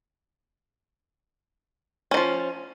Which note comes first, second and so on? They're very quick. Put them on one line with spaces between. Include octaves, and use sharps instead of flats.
C#4 D#3 F3